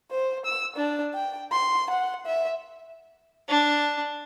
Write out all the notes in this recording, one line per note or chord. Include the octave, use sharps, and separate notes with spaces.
C5
E6
D4
G5
C6
F#5
E5
D4